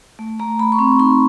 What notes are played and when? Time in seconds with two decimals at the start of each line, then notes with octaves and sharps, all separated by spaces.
0.19 A3
0.39 A3 A#5
0.59 A3 B5
0.72 C#6
0.79 C4 C6
0.99 D#4 C6